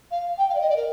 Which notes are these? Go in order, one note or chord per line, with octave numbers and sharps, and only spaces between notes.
F5
G5
F5
D5
D#5
D5
A#4